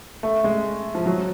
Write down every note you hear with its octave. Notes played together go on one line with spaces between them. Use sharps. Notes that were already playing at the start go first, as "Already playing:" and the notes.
A3
G#3
F3
F#3